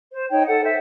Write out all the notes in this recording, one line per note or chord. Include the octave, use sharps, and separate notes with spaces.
C5
D#4 C#5 G5
A4 F#5
C5 E5